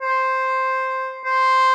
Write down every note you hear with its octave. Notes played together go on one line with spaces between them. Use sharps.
C5
C5